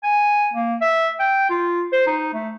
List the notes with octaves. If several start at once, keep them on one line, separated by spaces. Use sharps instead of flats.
G#5
A#3
E5
G5
F4
C5
D#4
A3